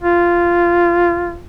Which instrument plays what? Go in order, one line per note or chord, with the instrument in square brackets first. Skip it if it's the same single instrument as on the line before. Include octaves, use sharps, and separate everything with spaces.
[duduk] F4